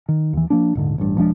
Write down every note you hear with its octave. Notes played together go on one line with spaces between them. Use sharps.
D#3
D#2 E3
F3 A#3 D4
D#1 G#2 D3
A1 G2
E1 F3 G#3 D4